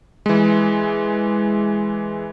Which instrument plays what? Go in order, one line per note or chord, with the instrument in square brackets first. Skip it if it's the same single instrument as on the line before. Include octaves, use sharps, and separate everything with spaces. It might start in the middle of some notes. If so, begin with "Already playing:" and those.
[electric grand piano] E3 G#3